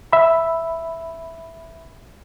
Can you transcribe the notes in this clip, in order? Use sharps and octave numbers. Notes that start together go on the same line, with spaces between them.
E5 B5